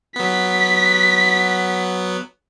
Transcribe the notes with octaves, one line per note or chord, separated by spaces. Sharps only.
F#3 B3 B6